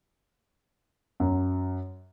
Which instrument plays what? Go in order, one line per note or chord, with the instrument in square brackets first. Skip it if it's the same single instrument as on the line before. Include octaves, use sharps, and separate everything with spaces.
[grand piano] F#2